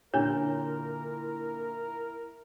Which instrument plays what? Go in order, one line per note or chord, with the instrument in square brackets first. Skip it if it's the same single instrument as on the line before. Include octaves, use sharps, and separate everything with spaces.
[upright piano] A#2 D3 [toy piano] D4 C#5 [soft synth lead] E4 [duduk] A#4